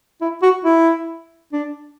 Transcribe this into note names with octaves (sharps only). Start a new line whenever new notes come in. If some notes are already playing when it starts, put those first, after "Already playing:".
E4
F#4
E4
D4